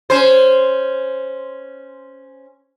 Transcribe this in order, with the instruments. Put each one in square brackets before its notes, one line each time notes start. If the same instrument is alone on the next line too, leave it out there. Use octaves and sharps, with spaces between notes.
[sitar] C#4 C5